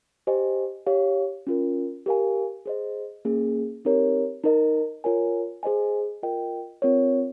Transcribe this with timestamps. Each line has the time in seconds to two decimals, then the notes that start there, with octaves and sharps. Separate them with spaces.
0.27 G4 C5 D#5 G#5
0.86 G4 C#5 F5
1.47 C#4 F4 A#4
2.06 G4 A#4 F5 G#5
2.66 G#4 C5 D#5
3.25 A#3 C#4 G#4
3.85 C4 D#4 G4 A#4 C#5
4.44 D#4 A#4 D#5
5.04 F4 A#4 C#5 G#5
5.63 G#4 C5 D#5 G#5
6.23 F4 A#4 D#5 G5
6.82 C4 F4 A#4 C#5